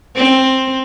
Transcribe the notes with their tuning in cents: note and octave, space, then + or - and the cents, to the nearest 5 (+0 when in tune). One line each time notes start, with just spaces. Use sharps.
C4 +10